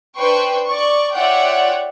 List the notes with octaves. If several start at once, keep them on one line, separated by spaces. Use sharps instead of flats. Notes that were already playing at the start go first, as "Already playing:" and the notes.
D4 B4 C5 G5 C6 C#6
D5 C#6
F4 C#5 D5 E5 F#5 G5